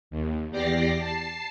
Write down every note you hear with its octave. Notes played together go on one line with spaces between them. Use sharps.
D#2
E2 G4 D5 D6 A#6 C7
A5 C7